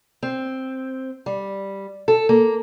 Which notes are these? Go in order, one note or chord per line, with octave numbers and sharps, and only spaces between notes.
C4
G3
A4
A#3